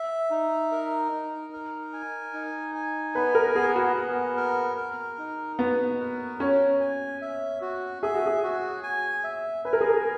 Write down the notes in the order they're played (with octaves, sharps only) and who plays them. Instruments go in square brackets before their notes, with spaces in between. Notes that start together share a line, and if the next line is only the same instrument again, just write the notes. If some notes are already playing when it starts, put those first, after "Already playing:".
Already playing: [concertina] E5
D#4
A#4
D#4
A#4
G#5
D#4
G#5
[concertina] B3 [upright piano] B4
[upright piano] A#4
[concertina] B3 [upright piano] G#4
[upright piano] F#4
[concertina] B3
A#4
A#4
D#4
[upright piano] B3 [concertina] F#4
[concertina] A#4
[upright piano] C#4 [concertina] F#4
[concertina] G#5
E5
F#4
[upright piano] G#4 [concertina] E5
[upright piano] F#4
G#4
[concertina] F#4
G#5
E5
[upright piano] B4 [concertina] G#5
[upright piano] A#4
G#4
A#4